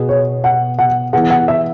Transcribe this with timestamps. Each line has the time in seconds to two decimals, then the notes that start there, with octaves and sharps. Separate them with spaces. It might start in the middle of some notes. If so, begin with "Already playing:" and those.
Already playing: B2 B3 G#4
0.09 C#5
0.44 F#5
0.79 F#5
1.13 E3 B3 G#4 F#5
1.30 F#5
1.48 E5